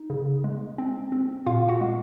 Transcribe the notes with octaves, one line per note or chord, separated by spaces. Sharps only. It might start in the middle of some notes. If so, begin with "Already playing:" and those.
Already playing: D#4
C#3
G#3
C4
C4
A#2 F4 F5
F#4 F#5
G#3